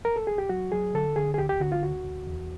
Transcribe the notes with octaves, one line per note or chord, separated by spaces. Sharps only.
A#4
A4
G#4
G4
F#3 F#4
F#3 G#4
D3 A4
D3 G#4
G#4
D2 G4
G4
D3 F#4
F4
D2 F#4
D2
E2